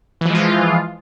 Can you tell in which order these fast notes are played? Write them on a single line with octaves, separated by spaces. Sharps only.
E3 F3 G#3 F4